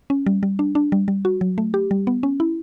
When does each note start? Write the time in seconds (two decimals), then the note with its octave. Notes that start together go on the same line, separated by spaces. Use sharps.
0.10 C#4
0.26 G3
0.43 G3
0.59 D4
0.75 D4
0.92 G3
1.08 G3
1.25 F#4
1.41 F#3
1.58 A3
1.74 G4
1.91 G3
2.07 B3
2.23 C#4
2.40 E4